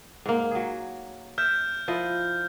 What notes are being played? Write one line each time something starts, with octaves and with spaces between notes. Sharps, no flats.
G#2 A#3
F#3 G#4
E5 F6 G6
F3 E4 D#5